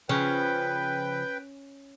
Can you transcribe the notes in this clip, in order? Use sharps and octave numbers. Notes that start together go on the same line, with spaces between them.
C#3 F3 C#4 B4 G5